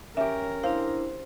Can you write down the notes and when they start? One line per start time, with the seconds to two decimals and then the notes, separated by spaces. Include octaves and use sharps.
0.17 C#4 G4 A#4 E5
0.64 D4 E4 C5 F5